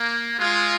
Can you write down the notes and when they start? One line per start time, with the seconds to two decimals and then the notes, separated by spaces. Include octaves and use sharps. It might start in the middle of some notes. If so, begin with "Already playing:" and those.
Already playing: A#3
0.39 G#3 F4